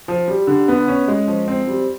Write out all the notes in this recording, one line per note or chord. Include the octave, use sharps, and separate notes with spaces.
F3
G3
D3
B3
C#4
G#3
F3
C4
G3